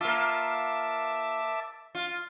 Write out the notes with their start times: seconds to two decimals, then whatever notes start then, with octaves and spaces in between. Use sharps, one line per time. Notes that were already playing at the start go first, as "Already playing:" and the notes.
0.01 A#3 F4 E5 A5 D6
1.95 F4